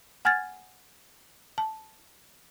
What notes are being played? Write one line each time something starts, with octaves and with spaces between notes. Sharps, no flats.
F#5 G#5 F6 G#6 A6
A5